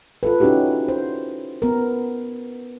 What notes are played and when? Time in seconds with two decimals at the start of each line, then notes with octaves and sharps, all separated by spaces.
0.23 F4 A4 B4
0.40 C#4 D#4 E4 F#4 G4
0.89 C5
1.62 B3 A#4